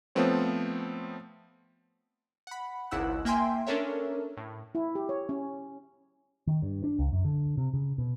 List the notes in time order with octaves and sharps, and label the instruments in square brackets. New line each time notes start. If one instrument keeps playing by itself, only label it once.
[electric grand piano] F3 A3 B3 C4 C#5
[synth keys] F#5 B5
G#1 C#2 E4 F#5 E6 F#6
A#3 E5 G5 G#5 C6
C#4 D4 A4 A#4 C#5 E5
A2
[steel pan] E4
G4
C#5
C#4
[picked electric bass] D#3
G2
D4
C#2
F#2
D3
C3
C#3
B2